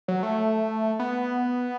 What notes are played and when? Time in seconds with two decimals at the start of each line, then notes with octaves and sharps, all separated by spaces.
0.08 F#3
0.23 A3
0.99 B3